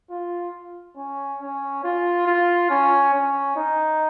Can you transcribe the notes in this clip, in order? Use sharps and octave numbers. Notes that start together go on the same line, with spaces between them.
F4
C#4
C#4
F4
F4
C#4
C#4
D#4